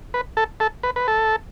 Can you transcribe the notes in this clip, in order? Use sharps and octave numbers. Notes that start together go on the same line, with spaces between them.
B4
A4
A4
B4
B4
A4